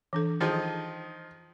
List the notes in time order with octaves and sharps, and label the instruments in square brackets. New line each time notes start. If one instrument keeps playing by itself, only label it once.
[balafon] E3 D4 A4
[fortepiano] D#3 F3 D#5 [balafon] G#4